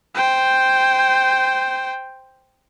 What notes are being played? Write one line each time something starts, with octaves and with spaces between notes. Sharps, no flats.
C5 G5